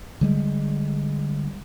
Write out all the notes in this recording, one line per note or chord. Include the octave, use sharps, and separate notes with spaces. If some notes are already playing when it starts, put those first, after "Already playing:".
D3 G3 G#3